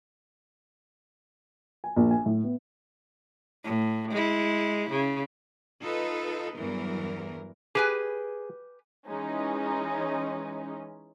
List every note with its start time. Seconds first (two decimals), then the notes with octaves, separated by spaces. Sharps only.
1.84 G#5
1.96 A#1
2.11 G#5
2.26 A2
2.44 B3
3.65 A2
4.11 G#3 E4
4.90 C#3
5.81 D#4 F4 A4 B4
6.57 E2 G2 E3 F#3 A#4
7.75 G4 G#4 B4 G#5
9.08 E3 G#3 C#4 D#4